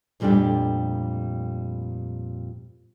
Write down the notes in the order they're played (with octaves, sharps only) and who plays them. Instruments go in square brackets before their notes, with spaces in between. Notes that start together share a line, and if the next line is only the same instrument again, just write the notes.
[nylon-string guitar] F2 A#2 G3 A3 D4 G5